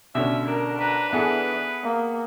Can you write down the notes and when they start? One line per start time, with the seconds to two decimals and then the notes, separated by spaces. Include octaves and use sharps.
0.15 B2 D3 G3 C#4 E5
0.48 D4 A#4
0.80 B4 A#5
1.13 E3 B3 G#4 A4
1.83 A#3